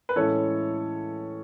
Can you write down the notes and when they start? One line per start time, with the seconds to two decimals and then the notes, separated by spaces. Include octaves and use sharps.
0.09 B4
0.16 A2 E3 G#3 C#4 E4 A4 C#5